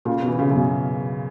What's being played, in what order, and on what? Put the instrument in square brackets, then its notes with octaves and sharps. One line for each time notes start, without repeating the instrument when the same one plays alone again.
[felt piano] A#2 [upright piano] C#3
[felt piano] B2
[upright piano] E3
[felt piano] C#3
[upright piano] F#2
[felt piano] B2